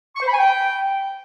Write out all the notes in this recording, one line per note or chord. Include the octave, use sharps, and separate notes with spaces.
C#6
C5
B5
G#5
G5